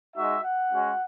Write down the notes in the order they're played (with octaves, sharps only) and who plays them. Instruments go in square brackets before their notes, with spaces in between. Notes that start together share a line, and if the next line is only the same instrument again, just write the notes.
[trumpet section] G#3 D#4 F#4 E5
F#5
G#3 C#4 F#4